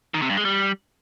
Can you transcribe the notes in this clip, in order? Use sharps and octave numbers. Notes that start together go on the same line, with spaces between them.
D#3
C3
G2
G#3
G3